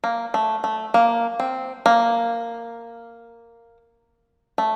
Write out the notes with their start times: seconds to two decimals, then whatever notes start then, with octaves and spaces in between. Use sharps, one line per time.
0.04 A#3
0.34 A3
0.64 A3
0.94 A#3
1.40 C4
1.86 A#3
4.58 A3